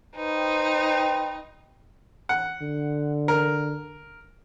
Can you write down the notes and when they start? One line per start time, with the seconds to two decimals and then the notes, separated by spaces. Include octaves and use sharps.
0.16 D#4 B4 C5 G5
2.29 F#5
2.62 D3
3.28 A#4